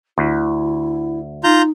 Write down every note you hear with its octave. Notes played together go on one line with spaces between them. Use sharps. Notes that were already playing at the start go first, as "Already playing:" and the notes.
D2 E4
D#4 F4 A#5 G6